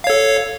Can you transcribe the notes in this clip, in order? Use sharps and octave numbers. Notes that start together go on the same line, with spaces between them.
A4 C#5 F5